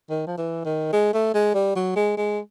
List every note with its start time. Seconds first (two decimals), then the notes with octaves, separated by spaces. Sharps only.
0.10 D#3
0.27 F3
0.38 E3
0.65 D#3
0.93 G#3
1.14 A3
1.34 G#3
1.55 G3
1.76 F#3
1.96 G#3
2.17 G#3